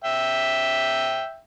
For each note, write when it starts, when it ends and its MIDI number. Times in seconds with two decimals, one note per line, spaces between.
0.04 1.39 76
0.04 1.39 79